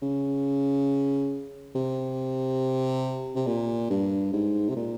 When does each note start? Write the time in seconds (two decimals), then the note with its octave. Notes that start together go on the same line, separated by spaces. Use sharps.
0.02 C#3
1.75 C3
3.35 C3
3.47 A#2
3.90 G2
4.33 G#2
4.68 C3
4.76 A#2